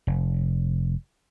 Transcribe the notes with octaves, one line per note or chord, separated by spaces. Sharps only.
F1